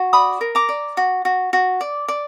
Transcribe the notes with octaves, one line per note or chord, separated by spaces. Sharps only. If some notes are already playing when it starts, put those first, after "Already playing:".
Already playing: F#4
D5 B5 D#6
A#4
A#5 D6
D5
F#4
F#4
F#4
D5
D5